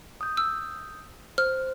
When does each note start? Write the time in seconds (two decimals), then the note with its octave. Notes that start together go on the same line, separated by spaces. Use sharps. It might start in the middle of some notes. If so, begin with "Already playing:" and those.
0.21 D#6 G6
0.37 E6
1.38 C5 F6